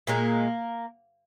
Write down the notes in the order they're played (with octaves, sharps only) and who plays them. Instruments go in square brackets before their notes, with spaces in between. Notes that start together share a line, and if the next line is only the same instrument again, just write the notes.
[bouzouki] A#2 G#3 A#3